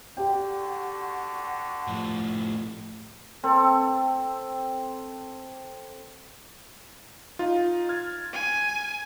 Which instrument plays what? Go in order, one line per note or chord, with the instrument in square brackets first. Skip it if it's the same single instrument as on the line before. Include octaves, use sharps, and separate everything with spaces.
[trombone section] D3 F#4 [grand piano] G4 G5
[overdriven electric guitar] A2 F3
[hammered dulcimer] C4 A4
[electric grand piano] D#4 F4
F6 G#6 A6
[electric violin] G#5